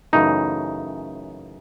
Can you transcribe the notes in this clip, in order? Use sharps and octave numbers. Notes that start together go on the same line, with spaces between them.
F#2 C#3 E3 A3 D#4